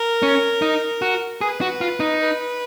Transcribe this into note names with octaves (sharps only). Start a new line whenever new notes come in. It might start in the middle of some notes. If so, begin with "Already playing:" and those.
Already playing: A#4
C#4
D#4
F#4
G#4 B4
F#4
F4
D#4
B4